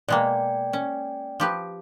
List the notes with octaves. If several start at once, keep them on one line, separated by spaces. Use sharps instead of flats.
B2 G#3 A#3 D5 G5
C#4
F3 G4 B4